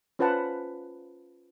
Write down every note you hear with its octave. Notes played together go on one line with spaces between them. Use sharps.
C#4 F4 B4 C5 F#5 A5